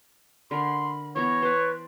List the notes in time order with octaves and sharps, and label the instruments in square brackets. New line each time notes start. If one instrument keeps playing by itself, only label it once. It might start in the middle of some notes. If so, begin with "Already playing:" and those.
[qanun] D3 A#4 [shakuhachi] B5 [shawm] C6
[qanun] E3 B3 A#5 [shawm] C#5
[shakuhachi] B4 [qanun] C5 D5